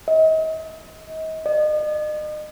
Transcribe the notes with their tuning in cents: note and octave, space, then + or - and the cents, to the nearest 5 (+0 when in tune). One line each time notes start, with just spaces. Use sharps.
D#5 +35
D#5 -40